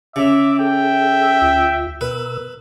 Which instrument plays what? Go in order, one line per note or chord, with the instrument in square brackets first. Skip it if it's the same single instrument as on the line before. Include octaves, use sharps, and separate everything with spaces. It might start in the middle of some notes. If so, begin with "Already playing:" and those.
[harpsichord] C#3 [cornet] E5 [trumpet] D6
[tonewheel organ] G#4 A4 [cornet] E5 [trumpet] G5
[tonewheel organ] D2 F4
[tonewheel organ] B2 A#4 E6 [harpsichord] B4